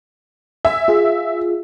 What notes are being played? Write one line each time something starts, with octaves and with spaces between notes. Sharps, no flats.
E5 G#5
F4 G#4